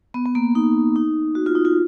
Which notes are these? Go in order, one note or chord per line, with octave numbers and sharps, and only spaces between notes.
B3
B3
A#3
D#4
D#4
F#4
F4
D#4
F4